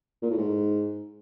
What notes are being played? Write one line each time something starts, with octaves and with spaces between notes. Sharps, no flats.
A#2
A2
G#2